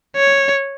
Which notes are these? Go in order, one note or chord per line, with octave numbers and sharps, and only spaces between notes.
C#5